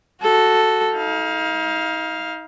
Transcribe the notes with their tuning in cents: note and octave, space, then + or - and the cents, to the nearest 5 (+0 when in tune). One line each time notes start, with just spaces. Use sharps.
F#4 +0 A4 +0
D#4 +40 F5 +0